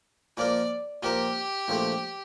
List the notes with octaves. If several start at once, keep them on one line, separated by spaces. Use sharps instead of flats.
A#2 F3 A#3 F4 A#4 D5
A#2 F3 A#3 F4 G4 A#4
A#1 A#2 F3 A3 C4